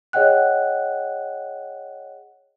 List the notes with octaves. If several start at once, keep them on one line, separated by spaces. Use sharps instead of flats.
G#4 C#5 D#5 F#5 G5 F#6